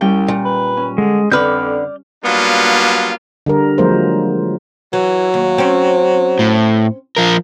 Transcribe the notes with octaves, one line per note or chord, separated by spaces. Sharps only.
C2 G3 C#4 G5
A#2
B4
C#4
D3 G#3
F2 D3 B4 D5 F6 G6
F#3 G3 A#3 B3 D4 F4
D3 G3 A#4
F3 F#3 G#3 A#3 A#4 C5
E3 F#3
D#2
C4 C#4
A2
F3 A#4